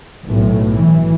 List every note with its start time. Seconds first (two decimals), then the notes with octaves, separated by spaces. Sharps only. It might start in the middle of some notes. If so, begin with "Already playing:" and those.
0.24 B1 A2
0.77 E3